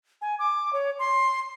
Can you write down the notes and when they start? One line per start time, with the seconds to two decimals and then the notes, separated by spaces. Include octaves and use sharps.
0.22 G#5
0.39 D6
0.73 C#5
0.99 C6